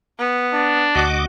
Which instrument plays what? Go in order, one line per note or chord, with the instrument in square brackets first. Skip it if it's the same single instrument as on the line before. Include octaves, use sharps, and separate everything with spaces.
[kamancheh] B3
[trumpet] D4
[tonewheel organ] D2 D#5 D6 [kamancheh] F#4